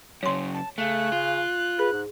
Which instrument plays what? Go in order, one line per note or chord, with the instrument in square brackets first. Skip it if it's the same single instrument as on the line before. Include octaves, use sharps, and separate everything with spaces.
[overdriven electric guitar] F#2 C#3 [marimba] C#5 C6
[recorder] A5
[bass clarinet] C#3 [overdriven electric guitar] A3 [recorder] F#6
[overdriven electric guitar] F4
[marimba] G#4 [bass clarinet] B4
[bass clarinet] G#2